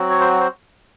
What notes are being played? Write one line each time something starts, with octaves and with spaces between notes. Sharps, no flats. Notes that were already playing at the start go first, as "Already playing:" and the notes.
Already playing: F#3 C4 F#4
C#5
C5
C5